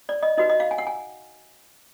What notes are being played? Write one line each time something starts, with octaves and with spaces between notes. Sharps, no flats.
D5
D#5
D#4 F#4 B4 D#5
D#5
F5
G#5
F#5
G#5